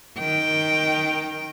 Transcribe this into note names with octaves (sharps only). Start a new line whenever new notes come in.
D#3 G5